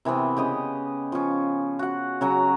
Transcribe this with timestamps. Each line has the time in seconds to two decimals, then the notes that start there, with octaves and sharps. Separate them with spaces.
0.05 C3 E3 B3 C4
0.37 C#3 G4 D#5
1.12 F3 C#4
1.79 F#4 F#5
2.21 C#3 F#3 A#5